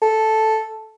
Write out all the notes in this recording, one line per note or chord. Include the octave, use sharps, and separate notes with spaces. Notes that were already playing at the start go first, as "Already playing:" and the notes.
A4